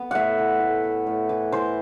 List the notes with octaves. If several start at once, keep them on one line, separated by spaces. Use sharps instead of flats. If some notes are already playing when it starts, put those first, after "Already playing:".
Already playing: B3
A2 E5 F#5
E3
A2
B3
A2
E3
E3 C5